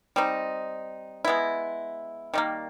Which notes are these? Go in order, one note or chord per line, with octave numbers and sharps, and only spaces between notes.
G3 C4 D#4
G#3 B3 E4
D#3 G3 A#3